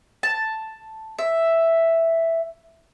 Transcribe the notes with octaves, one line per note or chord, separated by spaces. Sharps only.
A5
E5